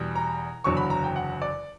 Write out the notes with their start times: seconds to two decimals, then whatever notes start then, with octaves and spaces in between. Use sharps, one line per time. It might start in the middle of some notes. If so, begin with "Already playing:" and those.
Already playing: E2 B2 G3
0.15 A#5
0.64 F#1 E2 D3 F#3 C#6
0.77 B5
0.90 A#5
1.04 G5
1.16 F#5
1.42 D5